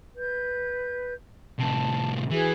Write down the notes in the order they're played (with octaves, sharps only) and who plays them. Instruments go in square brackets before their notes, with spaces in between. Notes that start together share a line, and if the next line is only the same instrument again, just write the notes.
[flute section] B4 G6
[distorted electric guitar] A2 C3 [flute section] A5
[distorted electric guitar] E3 [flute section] F#4 G#4 B4